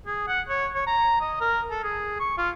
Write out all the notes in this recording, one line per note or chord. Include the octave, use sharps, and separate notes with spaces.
G#4
F#5
C#5
C#5
A#5
D#5
A#4
A4
G#4
C#6
F4